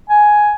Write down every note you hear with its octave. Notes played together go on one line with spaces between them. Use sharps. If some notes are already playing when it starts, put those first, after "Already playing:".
G#5